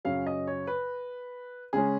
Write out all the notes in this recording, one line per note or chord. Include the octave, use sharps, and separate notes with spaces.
F#2 C#3 F#3 C#4 F5
D#5
C#5
B4
C#3 G#3 C#4 G#4